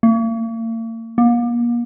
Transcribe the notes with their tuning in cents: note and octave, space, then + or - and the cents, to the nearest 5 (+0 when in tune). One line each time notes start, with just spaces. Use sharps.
A#3 -45
A#3 +35